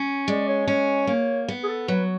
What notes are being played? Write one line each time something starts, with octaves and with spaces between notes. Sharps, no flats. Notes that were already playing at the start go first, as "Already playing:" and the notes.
Already playing: C#4
G#3 D5
C#5
C#4 C#5
A#3 C#5
B3
G#4
A4
F#3 B4